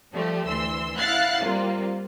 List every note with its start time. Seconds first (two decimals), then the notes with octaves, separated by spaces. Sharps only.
0.12 F3 G3 A3 G4
0.47 D2 E3 C6 E6
0.98 E4 F5 F#5 F#6 A6 C7
1.43 G3 A#3 C4 F4